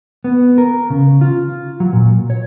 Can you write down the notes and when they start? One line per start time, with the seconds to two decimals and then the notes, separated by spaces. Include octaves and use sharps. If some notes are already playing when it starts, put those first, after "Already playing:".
0.24 B3
0.58 A#4
0.90 C#3
1.21 F4
1.80 F#3
1.93 A#2
2.30 C#5